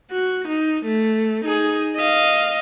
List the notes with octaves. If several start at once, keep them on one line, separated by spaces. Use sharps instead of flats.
F#4
D#4
A3
D#4 G#4
D#5 F5